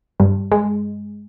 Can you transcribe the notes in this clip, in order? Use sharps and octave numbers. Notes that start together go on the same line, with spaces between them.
G2
G#3